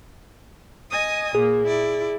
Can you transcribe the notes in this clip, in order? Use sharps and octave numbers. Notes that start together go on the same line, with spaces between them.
D#5 G#5 D#6
A#2 A#3 G#4
E4 D5